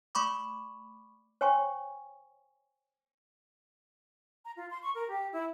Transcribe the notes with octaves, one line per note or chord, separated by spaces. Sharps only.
A3 B5 C#6 D6
C5 C#5 G5 G#5 C6 C#6
A#5
F4
C6
C#6
A#4
G4
E4